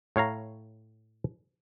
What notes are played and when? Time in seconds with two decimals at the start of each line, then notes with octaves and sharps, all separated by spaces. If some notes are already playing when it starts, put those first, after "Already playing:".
0.16 A2 C#5 F5 A#5